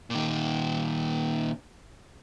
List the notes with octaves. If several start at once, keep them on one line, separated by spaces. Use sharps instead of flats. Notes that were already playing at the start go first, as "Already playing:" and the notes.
A#2 D#3